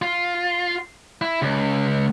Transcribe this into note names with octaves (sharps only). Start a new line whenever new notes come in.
F4
E4
C#2